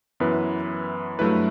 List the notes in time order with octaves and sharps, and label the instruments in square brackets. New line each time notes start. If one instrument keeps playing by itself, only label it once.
[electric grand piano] F#2 E3 B3 E4 B4
G2 F#3 A3 E4 B4